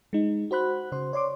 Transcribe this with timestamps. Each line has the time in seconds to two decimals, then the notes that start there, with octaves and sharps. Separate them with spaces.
0.13 G#3 D#4
0.51 F#4 C5 B5 F#6
0.92 C#3 C5 C6
1.13 C#5 D5 C6 D6